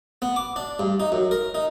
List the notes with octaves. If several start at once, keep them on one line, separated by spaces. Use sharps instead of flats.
B3
D6
D4
G2
D#4
F#2
A#4
D#4